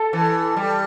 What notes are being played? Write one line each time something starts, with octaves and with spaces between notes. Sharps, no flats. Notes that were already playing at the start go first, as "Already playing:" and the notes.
Already playing: A4
E3
G3